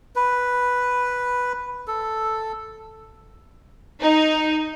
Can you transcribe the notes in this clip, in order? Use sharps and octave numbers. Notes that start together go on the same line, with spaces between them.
B4
A4
D#4